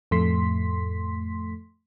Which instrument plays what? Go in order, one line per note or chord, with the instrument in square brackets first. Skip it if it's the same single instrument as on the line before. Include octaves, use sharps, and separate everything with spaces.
[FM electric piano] F2 A2 A3 C6 B6